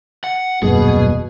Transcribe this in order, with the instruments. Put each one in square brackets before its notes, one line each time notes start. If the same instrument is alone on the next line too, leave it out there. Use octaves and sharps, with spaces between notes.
[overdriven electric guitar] F#5
[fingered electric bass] D#1 F#2 A#3 [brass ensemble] B2 [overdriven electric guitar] G#4